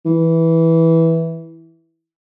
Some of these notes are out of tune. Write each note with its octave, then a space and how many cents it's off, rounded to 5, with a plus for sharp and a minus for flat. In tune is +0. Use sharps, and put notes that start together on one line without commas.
E3 -10